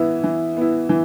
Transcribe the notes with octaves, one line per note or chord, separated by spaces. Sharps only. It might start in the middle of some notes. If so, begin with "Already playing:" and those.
Already playing: E3 B3 E4
E3
B3 E4
E3